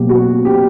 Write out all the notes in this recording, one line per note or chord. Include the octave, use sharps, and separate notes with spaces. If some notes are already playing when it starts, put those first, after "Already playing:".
Already playing: B2 F#3 A#3 G4
F#4
G4